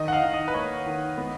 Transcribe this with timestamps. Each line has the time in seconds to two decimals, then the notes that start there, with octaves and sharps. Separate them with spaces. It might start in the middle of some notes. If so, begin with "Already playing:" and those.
Already playing: D#3 D#5
0.08 F#5
0.13 F5
0.22 D#3
0.33 D#5
0.48 B4
0.54 A#3 C#5
0.86 D#3
1.18 B3